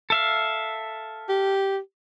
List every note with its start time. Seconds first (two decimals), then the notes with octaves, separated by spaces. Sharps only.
0.10 A4 E5 F5
1.29 G4